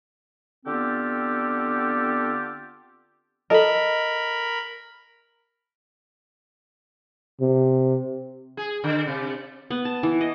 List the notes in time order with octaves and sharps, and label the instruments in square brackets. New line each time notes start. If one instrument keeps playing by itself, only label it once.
[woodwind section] D3 B3 C4 F4 G4 A4
[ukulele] A4 D#5 [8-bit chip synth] A#4 B5
[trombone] C3
[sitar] G#4
D3
C3
[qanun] B3
A5
E3
D#5